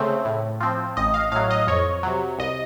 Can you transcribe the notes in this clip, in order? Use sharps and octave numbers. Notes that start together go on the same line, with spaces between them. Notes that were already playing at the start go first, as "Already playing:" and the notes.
Already playing: C#3 A3 C4
A2
F3 C4
A1 D#5
F5
A2 F#3 F5
D#5
F2 C#5
C3 F#3
C2 D#5